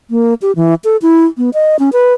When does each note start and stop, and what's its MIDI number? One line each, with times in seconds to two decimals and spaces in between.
0.10 0.34 58
0.42 0.52 67
0.56 0.74 52
0.84 0.97 69
1.02 1.25 64
1.38 1.50 59
1.54 1.76 75
1.79 1.90 61
1.93 2.14 71